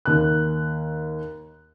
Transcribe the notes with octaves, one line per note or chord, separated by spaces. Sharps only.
D#2 F#6